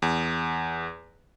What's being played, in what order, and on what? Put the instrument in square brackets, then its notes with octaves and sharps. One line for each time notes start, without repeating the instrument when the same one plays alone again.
[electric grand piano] E2